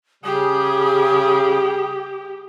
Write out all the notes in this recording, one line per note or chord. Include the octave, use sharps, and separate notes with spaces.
C#3 G3 G4 G#4 D#6